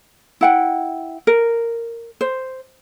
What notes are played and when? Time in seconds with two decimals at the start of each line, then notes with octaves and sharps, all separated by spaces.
0.41 E4 F#5 G5
1.27 A#4
2.21 C5